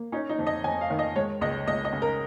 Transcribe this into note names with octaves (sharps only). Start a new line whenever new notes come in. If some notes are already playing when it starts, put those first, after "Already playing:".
Already playing: A#3
C#4 D#4
D#4
F2
D#5
F2 G#5
F5
D#3
D#5
G#3 C#5
C#2 D#5
C#2 D#5
D#5
C#3
A#4